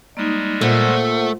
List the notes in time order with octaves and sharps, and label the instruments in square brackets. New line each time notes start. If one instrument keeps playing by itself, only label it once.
[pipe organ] G3 G#3 [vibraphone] A#3 D#4
[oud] A#2 [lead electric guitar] A3 [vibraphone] C5 F#5